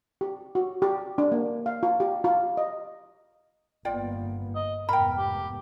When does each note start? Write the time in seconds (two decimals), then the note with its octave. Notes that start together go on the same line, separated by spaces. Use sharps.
0.21 G4
0.55 F#4
0.82 G4
1.18 D4
1.32 A#3
1.66 F5
1.83 F4
2.00 G4
2.24 F4
2.57 D#5
3.85 G1 A#3 B3 F4 D5 G5
4.56 D#5
4.89 F1 G#2 B3 A#4 G5 B5
5.18 G4